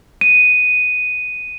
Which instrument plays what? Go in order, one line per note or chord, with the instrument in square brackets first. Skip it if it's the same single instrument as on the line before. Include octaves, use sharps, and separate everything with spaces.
[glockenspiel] D#7